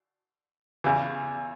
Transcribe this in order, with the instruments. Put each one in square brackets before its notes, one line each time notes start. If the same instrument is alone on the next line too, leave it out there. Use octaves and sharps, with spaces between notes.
[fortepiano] E2 C#3 E3